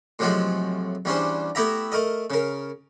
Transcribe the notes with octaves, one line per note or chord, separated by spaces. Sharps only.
A2 C3 F3 F#3 G#3 F#4
E2 G3 C#4 D4 C5
A3 B3 E4 G4 E5 A#5
A3 A#4 D#5
C#3 A#4